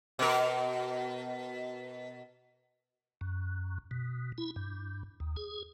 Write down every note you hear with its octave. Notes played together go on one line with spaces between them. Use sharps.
B2 A#4
F#2
B2
E4
G2
D#2
G#4